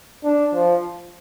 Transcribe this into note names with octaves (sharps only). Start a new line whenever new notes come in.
D4
F3